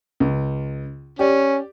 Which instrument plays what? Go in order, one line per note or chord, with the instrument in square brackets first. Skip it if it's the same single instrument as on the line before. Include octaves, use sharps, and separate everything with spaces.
[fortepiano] C#2
[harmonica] C#4 [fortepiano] G4 D5